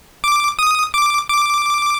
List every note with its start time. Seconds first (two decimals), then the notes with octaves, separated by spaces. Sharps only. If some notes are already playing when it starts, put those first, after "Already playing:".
0.24 D6
0.59 D#6
0.94 D6
1.29 D6